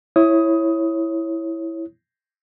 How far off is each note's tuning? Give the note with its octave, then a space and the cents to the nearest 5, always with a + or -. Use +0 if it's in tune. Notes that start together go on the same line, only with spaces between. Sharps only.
E4 +0 C#5 -15 D#6 +15